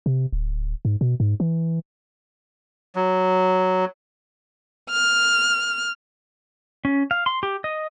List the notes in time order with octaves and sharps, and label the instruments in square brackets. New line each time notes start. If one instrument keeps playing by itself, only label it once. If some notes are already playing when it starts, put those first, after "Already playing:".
[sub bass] C3
D1
G#2
B2
G#2
E3
[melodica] F#3
[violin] F6
[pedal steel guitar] C#4
F5
C6
G4
D#5